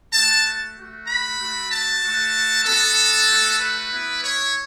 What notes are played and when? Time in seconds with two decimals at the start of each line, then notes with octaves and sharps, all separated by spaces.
0.12 A3 F#4 A5
0.76 A3 F#4
1.07 B5
1.38 A3 F#4
1.71 A5
2.02 A3 F#4
2.65 B3 F#4 A4
3.28 A3 F#4
3.59 B4
3.91 B3 E4
4.22 C#5